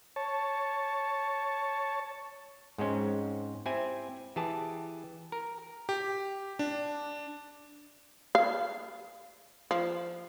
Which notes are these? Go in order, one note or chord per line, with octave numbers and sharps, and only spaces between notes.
C#5 A5
G#2 G#3 C4 C#4
C4 E4 G4 E5 G#5
E3 G4 G#4 A5
A#4
G4
D4
F5
F3